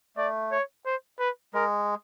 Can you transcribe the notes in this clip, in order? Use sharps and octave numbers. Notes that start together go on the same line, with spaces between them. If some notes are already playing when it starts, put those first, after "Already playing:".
A3 D5
C#5
C5
B4
G#3 A#4